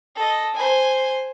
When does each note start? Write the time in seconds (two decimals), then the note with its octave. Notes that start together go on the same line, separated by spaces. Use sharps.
0.16 A4 D#5
0.55 C5 G#5